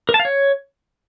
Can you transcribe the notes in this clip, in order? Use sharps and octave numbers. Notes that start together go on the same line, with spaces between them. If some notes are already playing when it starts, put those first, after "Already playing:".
A#4
A5
F5
C#5